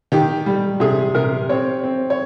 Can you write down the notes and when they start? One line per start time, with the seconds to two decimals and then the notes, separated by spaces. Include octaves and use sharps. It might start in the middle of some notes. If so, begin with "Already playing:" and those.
0.12 D#3 G4
0.46 G3
0.80 C3 G#4
1.14 C3 A#4
1.49 C4 C#5
1.84 C4
2.10 C#5